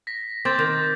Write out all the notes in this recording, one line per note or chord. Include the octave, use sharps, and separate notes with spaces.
A#6 B6
C4 D6 G6 A6
D#3